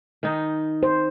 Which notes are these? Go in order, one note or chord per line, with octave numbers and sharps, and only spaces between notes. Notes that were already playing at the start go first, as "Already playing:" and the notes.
D#3 D#4
C5